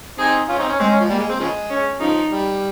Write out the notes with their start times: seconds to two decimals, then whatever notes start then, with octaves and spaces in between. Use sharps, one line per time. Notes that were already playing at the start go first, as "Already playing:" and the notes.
0.18 C4 D#4 G#4
0.49 C#4 F4
0.59 C4 D#4
0.69 C#4
0.79 G#3 C4
0.90 C#4
1.00 F3
1.09 G3 A#3
1.20 G#3
1.29 C4
1.40 C#3 F3 G#3
1.70 C#4
2.00 C#3 F3 D#4
2.30 G3